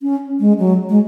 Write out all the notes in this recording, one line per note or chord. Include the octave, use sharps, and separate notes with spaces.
C#4
G#3
F#3
G#3